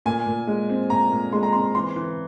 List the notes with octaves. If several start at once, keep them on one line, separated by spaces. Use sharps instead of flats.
A#2 G#5
A#2
G#3
C4
A#2 A#5
A#2
G#3 C6
A#5
C4 C6
E3 C6
E3